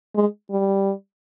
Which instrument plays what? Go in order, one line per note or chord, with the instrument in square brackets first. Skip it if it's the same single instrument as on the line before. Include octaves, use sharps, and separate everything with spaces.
[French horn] G#3
G3